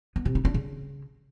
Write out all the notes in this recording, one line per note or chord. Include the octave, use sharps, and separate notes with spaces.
B3
C3
D#4
D4
C#3